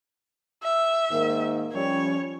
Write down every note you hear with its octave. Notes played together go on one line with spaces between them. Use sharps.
E5
G#2 D#3 A#3
F3 G3 C#4 C#5